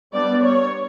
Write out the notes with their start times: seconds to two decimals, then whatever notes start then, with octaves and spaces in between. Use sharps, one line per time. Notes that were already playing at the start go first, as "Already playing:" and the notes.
0.14 G3 B3 D4 D5
0.43 C#5